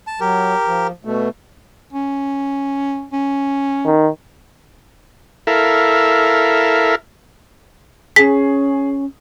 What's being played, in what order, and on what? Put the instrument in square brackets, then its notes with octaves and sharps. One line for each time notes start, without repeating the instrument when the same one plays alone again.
[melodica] A5
[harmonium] F#3 [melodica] G4 A#4
[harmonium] F3
B2 A3
[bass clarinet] C#4
C#4
[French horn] D#3
[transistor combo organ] E4 A4 A#4 E5 F5
[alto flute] C#4 [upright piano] G#4 [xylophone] B6